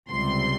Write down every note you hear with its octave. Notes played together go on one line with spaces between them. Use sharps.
C#2 C3 G3 C6